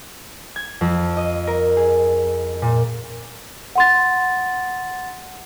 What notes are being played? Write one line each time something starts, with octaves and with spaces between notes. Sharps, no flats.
G#6
F2
D#5
A#4
G#4
A#2
F#5 C6 A6